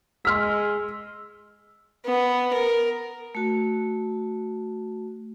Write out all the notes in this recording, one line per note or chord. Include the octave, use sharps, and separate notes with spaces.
G#3 C6 E6 F6 B6
B3
A#4
A3 F#4